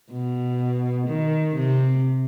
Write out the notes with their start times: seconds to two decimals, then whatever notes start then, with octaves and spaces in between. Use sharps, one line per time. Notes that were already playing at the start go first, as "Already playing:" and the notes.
0.11 B2
1.08 D#3
1.55 C3